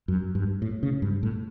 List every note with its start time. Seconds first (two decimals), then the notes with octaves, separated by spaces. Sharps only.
0.08 F#2
0.35 G2
0.62 A2
0.83 C#3
1.02 G2
1.23 A2